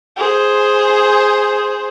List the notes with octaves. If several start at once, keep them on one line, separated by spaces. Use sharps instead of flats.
G#4 C5